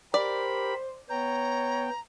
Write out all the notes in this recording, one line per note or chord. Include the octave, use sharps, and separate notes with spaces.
G4 A#4 C5 D5 B5
B3 C#5 G5 A#5